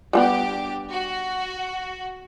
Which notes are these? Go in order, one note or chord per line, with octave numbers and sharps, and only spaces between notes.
G3 G#3 B3 D4 G4
F#4